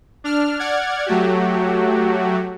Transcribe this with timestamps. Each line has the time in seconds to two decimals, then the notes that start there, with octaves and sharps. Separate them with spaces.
0.24 D4 F6
0.59 D5 F#5 F6 G#6
1.06 F#3 A3 F#4 G4